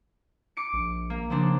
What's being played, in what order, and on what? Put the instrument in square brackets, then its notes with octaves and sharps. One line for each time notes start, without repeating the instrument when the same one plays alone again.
[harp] D6 C#7 D7
[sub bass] A#1
[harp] A#3
[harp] C#3 C4 D4 [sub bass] F3